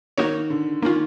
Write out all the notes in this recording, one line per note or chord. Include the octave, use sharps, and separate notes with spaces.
D#3 A#3 D#4 F#4 A#4 C#5
D3
D#3 A#3 C#4 F4